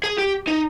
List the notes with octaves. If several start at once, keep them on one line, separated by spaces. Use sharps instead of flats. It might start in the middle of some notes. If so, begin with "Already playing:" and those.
G#4
G4
D#4